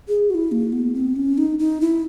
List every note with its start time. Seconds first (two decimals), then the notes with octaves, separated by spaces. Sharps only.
0.08 G#4
0.30 F#4
0.35 E4
0.52 A#3
0.72 B3
0.94 C4
1.16 C#4
1.38 D#4
1.59 D#4
1.81 E4